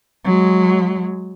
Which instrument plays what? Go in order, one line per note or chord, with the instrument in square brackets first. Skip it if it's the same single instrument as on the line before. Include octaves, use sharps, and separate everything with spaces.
[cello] F#3 G#3